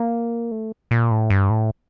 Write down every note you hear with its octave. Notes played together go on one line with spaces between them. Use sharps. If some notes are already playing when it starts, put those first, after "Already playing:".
Already playing: A#3
A3
A#2
A2
G2
A2